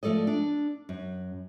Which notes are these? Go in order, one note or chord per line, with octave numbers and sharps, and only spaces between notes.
F3 A3 A4 D5 D#5
D4
F#2